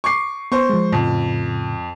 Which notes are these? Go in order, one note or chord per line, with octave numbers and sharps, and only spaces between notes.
C#6 D6 C7
B3 C5 C#6
F3 G#3
F2 A2 C#3